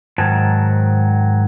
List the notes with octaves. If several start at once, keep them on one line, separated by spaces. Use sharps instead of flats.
G#2 D#3 F#3 A5